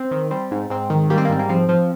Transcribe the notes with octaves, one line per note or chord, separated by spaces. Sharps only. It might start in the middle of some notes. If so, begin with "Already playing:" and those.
Already playing: C4
D#3
G3 C4
G#2
G#2 C4
D#3
G3 A#3
C4
A#3
G#2 C4
A#3
F3 C4
F3